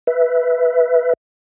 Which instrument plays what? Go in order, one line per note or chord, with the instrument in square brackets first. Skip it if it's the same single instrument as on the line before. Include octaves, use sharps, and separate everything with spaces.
[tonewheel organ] B4 E5